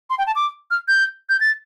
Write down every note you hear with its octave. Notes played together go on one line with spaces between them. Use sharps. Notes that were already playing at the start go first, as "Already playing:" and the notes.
C6
G5
A5
D6
F6
G6
G6
A6